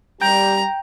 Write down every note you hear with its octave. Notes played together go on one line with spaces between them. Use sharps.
G3 G4 G5 A#5